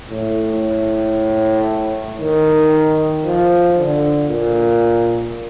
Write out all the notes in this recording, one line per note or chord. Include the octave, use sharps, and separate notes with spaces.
A2
D#3
F3
D3
A#2